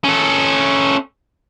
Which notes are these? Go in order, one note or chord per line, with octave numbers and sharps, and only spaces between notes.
C#4 A4